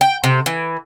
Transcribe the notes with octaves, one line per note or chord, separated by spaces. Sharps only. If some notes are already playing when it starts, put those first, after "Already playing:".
G5
C3
E3